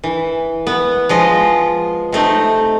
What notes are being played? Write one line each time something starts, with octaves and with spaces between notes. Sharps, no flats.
E3
B3
F3 G#3 D#5
C3 A3 D#4